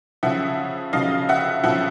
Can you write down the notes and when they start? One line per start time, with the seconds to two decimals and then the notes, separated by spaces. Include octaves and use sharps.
0.23 C#3 F3 E5 F#5
0.93 C#3 F3 D#5 F5
1.29 E5 F#5
1.63 C#3 F3 E5 F#5